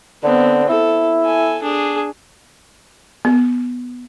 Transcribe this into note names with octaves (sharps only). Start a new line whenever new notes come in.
D3 B3 C4
E4 A4
A4 G#5
D4 G#4
B3